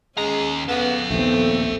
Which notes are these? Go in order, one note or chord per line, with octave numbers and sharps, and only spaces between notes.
D#2 G#3 C#4 A#5
B3 A4 F5
A#1 D#2 A3 B3 C4